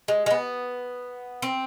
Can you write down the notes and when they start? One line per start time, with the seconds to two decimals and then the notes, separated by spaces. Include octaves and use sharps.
0.08 G#3
0.26 G#3
0.31 B3
1.42 C4